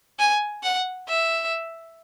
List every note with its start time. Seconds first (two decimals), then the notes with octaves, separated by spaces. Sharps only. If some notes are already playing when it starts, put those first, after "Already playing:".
0.19 G#5
0.63 F#5
1.08 E5